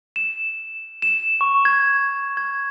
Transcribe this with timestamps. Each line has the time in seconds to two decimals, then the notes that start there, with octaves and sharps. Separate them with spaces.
0.16 E7
1.02 E7
1.41 C#6
1.65 G#6
2.37 G#6